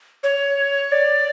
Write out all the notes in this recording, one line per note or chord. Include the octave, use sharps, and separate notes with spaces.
C#5
D5